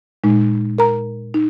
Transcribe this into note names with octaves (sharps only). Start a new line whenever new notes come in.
A#2 G#3 D#4
A#4 A#5
D#4